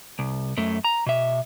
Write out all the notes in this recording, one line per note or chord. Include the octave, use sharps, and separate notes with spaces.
C2
F#2 A3
A#5
B2 E5